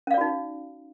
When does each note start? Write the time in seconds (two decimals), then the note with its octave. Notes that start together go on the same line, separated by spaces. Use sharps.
0.07 C#4
0.11 F5
0.14 D5
0.18 F#4
0.21 D#4